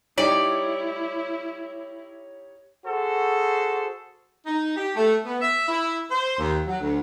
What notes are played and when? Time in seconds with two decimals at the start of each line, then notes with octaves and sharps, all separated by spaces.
0.18 G3 D#4 E4 G4 C#5 D5
2.86 F#4 G#4 A4 C5
4.46 D#4
4.77 G4
4.96 A3
5.24 B3
5.41 E5
5.68 E4
6.11 C5
6.38 D#2
6.68 F#3
6.80 D2